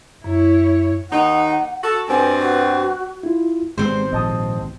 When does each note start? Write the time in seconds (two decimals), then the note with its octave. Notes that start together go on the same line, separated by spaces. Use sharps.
0.24 F#2 E4 C#5
1.11 D#2 D#4 F#5
1.83 F#4 A4
2.08 G2 B2 C4 G#5
2.39 F#4
3.23 E4 F4
3.78 G#1 C3 G#3 B3 C4 C5
4.13 A#1 D#5 A5 D#6